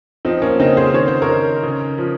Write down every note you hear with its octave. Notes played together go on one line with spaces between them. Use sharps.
F3 C4 D#4
A#3 C#4
C#3 C4 D#4
G#4 C5
D#3 C#5
C5
A#4 C#5
D#3
C#3
F3